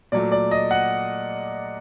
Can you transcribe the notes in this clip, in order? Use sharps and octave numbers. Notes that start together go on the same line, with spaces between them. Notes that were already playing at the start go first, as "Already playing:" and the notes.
A#2 F#3 A3 D5
D5
D#5
F#5